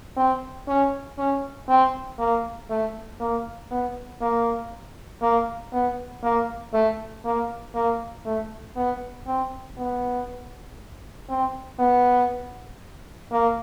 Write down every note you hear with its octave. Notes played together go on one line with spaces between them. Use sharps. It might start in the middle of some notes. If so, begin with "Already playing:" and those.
C4
C#4
C#4
C4
A#3
A3
A#3
B3
A#3
A#3
B3
A#3
A3
A#3
A#3
A3
B3
C4
B3
C4
B3
A#3